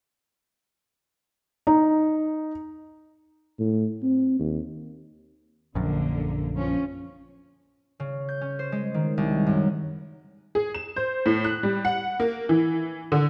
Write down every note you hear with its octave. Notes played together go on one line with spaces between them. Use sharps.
D#4
A2
C4
D#2
A#1 F#2 D3 A#3
F3 C#4
C#3
G6
C#4
C5
G#3
D#3
C2
F#2
G#4
E7
C5
A2
F#6
G3
F#5
A#3
E3
D3